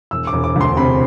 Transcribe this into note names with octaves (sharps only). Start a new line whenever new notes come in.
E1 E6
D6
E1
D6
D2 C6
C3 B5